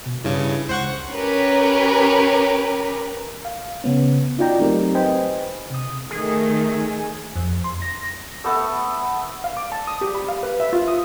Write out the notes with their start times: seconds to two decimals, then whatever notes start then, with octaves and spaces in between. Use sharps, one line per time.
0.06 B2
0.24 G2 C#3 E4
0.69 C#2 C5 F#5 C#6
1.11 C#4 G4 A#4 B4
3.45 F5
3.84 C#3 B3 C#4
4.38 D#4 F4 F#4 D5 G5 A#5
4.59 F#3 A3 C4 D#4 G4 A#4
4.95 B4 C5 D#5 G5 G#5 B5
5.70 C3 D#6
6.11 D#3 A3 G#4
7.36 F2
7.64 C6
7.82 A#6
8.44 A3 B3 A4 E5
9.44 F5
9.57 D6
9.72 A5
9.87 D#6
10.01 G4
10.15 B5
10.28 F5
10.43 B4
10.60 E5
10.73 F4
10.88 D#6